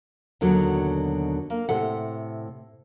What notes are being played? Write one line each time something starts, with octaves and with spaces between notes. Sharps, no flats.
D#2 B2 D3 F#3
A#3
A2 C3 A4 F#5